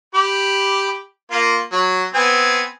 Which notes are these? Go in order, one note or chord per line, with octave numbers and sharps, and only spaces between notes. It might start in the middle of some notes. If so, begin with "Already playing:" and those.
G4 B5
A#3 F4
F#3
B3 C4 G#5